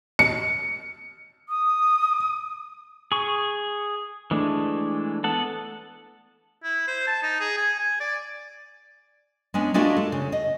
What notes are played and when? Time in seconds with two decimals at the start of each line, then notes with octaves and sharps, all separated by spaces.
0.19 C#7
1.49 D#6
3.12 G#4 C#6
4.31 E3 G#3 A3 D4
5.24 B3 A4 F#5 A5
6.64 E4
6.88 C5
7.07 A5
7.23 D#4
7.40 G#4
7.57 G#5
7.79 G#5
8.00 D5
9.54 G#3 B3 C#4 D4
9.74 G#3 A3 D4 F4 F#4 A#4
9.97 A4
10.12 C#3
10.32 D#5